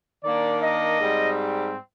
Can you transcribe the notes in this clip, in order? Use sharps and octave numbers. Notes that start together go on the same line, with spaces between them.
D#3 A#3 D4 D5
D#5
G#2 G3 C4